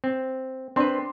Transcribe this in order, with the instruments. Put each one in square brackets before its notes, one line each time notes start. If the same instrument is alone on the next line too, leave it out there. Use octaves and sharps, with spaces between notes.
[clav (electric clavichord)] C4
[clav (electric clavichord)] C4 B4 [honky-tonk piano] D4 C6